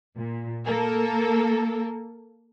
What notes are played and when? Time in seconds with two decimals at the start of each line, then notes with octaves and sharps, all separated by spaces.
0.15 A#2
0.66 A#3 A4 A#4